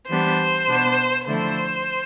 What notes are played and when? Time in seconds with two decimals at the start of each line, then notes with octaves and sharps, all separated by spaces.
0.09 E3 G3 B3 D4 C5
0.68 B2 B3 D4
1.28 D3 F3 A3 E4 C5